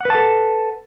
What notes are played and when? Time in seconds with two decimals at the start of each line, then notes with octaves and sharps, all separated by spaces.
0.01 F#5
0.05 B4
0.10 A5
0.15 A4